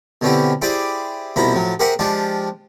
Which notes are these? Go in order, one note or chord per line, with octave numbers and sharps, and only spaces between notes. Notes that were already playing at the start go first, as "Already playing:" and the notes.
B2 D3 C4 C#4 E4 G4
E4 G4 G#4 C5 D5 D6
C2 B2 F3 E4 A#5 B5
A2 F3 F#3
G4 G#4 A#4 C5 E5 F#5
F3 G#3 D4 F4 G4